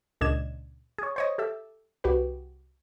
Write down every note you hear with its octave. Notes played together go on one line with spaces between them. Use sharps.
C#2 A#2 D4 D#5 G#6 E7
G#4 C#5
C5 C#5 D#5
G4 A4 E5
C2 F#4 G4 B4